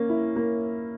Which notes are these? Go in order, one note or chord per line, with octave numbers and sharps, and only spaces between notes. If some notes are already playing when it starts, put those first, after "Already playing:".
Already playing: A#3 C#4
E4
A#3